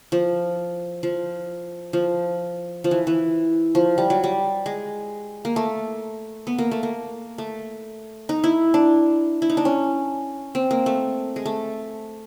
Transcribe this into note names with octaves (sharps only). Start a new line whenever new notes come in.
F3
F3
F3
F3
E3
E3
F3
G3
F#3
G3
G#3
A#3
A3
B3
A#3
A3
A#3
A3
D#4
E4
D4
E4
D#4
D4
C#4
C4
A#3
A3
G#3
A3